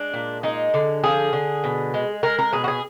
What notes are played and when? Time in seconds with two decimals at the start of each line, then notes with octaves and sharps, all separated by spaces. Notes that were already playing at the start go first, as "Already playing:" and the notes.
Already playing: G#3 D4
0.14 A#2
0.43 G#3 D#4
0.74 D3
1.04 F3 G#4
1.33 D3
1.64 B2
1.94 G#3
2.23 G#3 A#4
2.39 A#4
2.53 B2 G#4
2.64 F#4
2.68 G#4